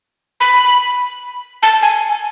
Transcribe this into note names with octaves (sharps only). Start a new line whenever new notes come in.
B5
A5
G#5